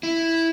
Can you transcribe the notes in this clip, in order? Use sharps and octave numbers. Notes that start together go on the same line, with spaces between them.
E4